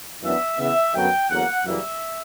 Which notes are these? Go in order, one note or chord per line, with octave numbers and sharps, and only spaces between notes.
F#2 E3 B3 D4 E5
C#3 E3 B3 E5
F#2 D3 F#3 B3 G5
E2 D3 F#3 A#3 F#5
F#2 C#3 E3 G3 A#3 E5